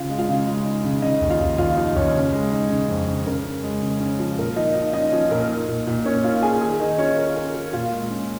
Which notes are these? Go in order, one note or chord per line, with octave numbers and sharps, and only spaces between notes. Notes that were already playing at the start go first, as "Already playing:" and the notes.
Already playing: C#3 F4 F5
G#3
F4 F5
C#3
G#3
D#4
C#3
C#3 D#4 D#5
D#2
F4 F5
D#2
D#2 F4 F5
F3 D#4 D#5
D#2 C#4 C#5
C#3
G#3
D#4
C#3
F2
C#3
C#3 A#4
C#4
G#3
C#3
C#4
F3
A#2 A#4
F3 D#4 D#5
D#4 F4 D#5
C#4 D#4 D#5
F3 C#4 C#5
A#2 A#4
D#4
A#2
A#2
A#3 C#4 C#5
D#4 F4 F5
D#4 G#4 G#5
D#3 G#4 G#5
D#3 D#4 D#5
C#4 F4 C#5
F4 A#4
C#4 A#4
F4 A#4
A#2 F4 F5
G#3
C#4